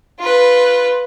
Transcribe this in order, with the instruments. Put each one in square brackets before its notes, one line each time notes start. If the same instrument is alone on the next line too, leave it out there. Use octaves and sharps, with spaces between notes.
[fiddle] F4 B4